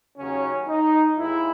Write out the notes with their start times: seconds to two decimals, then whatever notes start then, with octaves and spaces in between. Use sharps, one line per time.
0.18 D#2 C#3 F#3 C#4
0.68 D#4
1.17 D#2 D#3 G#3 E4